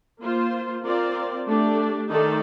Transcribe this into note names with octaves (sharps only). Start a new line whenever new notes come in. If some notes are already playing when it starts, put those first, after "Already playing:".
A#3 F4 C5
C4 F4 A#4 D5
A3 D4 G4 D5
D#3 A3 D#4 A4 D5